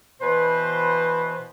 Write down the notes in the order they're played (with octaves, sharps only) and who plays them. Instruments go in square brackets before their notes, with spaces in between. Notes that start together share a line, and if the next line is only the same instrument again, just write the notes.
[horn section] B2 E3 B4 C5